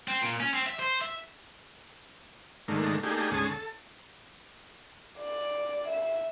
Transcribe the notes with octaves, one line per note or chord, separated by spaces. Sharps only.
C4
A#2
C#4
C4
E5
C5
E5
G#2 D3 D#3 A3 A#3
A3 A#3 D4 D#4 G4 G#4
D2 G#2 C#4 G#4 A5 D#6
A4
D5
E5